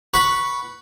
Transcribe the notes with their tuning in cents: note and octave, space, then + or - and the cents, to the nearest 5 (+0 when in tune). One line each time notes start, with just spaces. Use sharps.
B4 -10 F#5 +10 C#6 +0